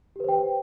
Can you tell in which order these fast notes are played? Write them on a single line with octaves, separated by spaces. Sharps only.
G4 B4 C5 G5